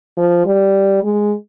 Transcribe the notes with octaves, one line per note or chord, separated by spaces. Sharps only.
F3
G3
G#3